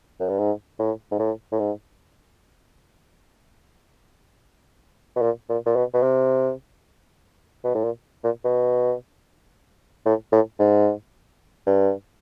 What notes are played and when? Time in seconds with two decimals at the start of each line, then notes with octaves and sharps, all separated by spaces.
0.20 F#2
0.29 G2
0.39 G#2
0.79 A2
1.11 G#2
1.19 A2
1.52 A2
1.59 G#2
5.16 B2
5.22 A#2
5.49 A#2
5.66 A#2
5.76 B2
5.94 B2
6.03 C3
7.64 B2
7.75 A2
7.84 A#2
8.24 A#2
8.44 B2
10.06 A2
10.32 A2
10.59 G#2
11.67 G2